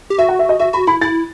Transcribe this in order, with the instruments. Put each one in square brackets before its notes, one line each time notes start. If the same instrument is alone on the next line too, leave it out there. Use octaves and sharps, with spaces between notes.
[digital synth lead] G4
[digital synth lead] F#4 [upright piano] E5
[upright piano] F#5
E5
D#5
[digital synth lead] F#4 [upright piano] E5
[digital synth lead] F#4 [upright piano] B5
[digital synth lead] E4 [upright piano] B5
[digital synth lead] E4 [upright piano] A6